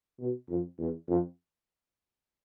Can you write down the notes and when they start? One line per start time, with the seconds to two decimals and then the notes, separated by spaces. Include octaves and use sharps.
0.19 B2
0.48 F2
0.78 E2
1.08 F2